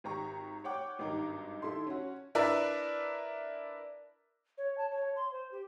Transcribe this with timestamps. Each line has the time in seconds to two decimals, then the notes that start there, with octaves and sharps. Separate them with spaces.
0.04 G#1 G4 A#5 C#6
0.64 C#5 F#5 G5 D6
0.99 G#1 G2 D#4 A#4 D6
1.62 D#3 E4 A4 C6
1.87 C#4 F#4
2.35 D4 E4 A#4 B4 D5 E5
4.58 C#5
4.78 A5
4.91 C#5
5.16 C6
5.32 C5
5.52 G4